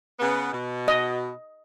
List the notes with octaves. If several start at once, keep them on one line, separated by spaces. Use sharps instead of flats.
C#3 B3
B2
D#5